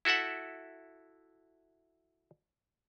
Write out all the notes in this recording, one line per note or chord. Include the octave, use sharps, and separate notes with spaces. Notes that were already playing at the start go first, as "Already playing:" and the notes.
E4 F#4 A4 E5 F#5